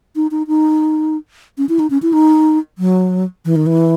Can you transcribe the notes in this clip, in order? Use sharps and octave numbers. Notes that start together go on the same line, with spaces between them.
D#4
D#4
D#4
C#4
E4
D#4
C#4
E4
D#4
F#3
E3
D#3
E3